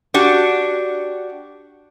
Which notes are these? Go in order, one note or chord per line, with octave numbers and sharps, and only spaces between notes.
D4 F#4 G4